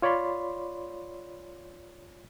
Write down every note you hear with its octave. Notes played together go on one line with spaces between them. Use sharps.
F4 C#5 D5 B5 C6